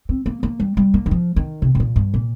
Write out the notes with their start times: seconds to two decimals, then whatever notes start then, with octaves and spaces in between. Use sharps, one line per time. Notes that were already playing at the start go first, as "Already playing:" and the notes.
0.09 C4
0.26 A#3
0.43 A#3
0.60 G3
0.77 G3
0.94 A#3
1.06 D#3
1.11 F3
1.36 D#3
1.62 C3
1.75 C3
1.80 A#2
1.96 G2
2.14 A#2